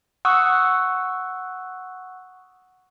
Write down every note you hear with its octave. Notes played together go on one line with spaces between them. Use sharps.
F#5 C#6 D#6 E6 F#6